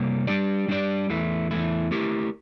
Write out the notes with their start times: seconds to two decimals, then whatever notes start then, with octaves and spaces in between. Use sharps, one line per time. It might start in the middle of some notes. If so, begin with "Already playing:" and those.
Already playing: C3 G3 A#3
0.27 G3 D4 G4 D5
0.68 G3 D4 G4 D5
1.09 E2 E3 A3 E4
1.51 E2 E3 A3 E4
1.91 A3 E4 G4 A#4